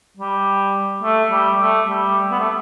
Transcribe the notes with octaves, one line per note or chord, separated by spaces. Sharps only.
G3
A3
G3
A3
G3
B3
A3